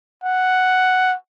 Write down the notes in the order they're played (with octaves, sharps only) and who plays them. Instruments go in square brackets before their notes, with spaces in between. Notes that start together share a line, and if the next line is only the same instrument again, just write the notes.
[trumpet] F#5